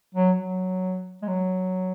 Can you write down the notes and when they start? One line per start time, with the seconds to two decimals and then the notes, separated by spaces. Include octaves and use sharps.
0.15 F#3
0.37 F#3
1.22 G#3
1.28 F#3